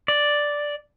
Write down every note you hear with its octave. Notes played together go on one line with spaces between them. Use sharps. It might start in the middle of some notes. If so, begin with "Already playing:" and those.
D5